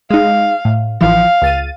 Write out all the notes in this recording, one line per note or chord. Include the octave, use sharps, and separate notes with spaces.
G#3 D#4 F5
A2
A1 E3 F3 F5
C#2 A6 D#7